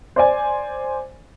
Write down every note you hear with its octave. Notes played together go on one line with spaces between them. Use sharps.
C5 D5 G#5